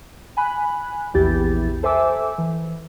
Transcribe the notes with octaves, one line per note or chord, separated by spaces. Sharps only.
G#5 B5 F#6
A#1 E2 E4 G4 G6 A6
A4 C5 E5 G#5 D6 E6
E3